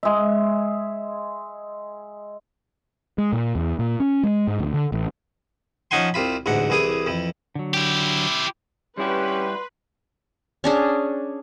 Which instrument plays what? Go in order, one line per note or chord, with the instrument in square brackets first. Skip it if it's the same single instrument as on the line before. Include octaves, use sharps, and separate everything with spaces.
[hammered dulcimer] G#3 E5
[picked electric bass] G#3
A#2
E2
A#2
C#4
G#3
G#2
D2
D3
A1
[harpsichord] F3 C#4 D#4 F#5 G#5 C6
C2 C3 F4 B5
A1 D2 G#2 D4 F#5
C2 E3 G#4 D6 D#6
F2 E3
[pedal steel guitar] D3 F#3
[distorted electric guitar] E4 G4
[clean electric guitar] G3 E4 F#4 [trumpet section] C#4 G4 [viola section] B4 [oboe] C6
[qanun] C#4 D4 G#4